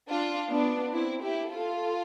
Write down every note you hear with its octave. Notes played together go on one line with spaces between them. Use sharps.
D4 F4
B3 D4
C4 E4
E4 G4
F4 A4